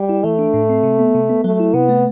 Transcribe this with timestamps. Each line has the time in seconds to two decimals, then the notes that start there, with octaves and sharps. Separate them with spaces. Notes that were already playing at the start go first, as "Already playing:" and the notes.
Already playing: G3
0.09 E4
0.24 E3 A3
0.39 D4
0.54 A2
0.70 C4
0.83 C3
0.99 B3
1.15 C3
1.29 B3
1.44 F#3 A3
1.60 E4
1.74 C3 B3
1.89 A3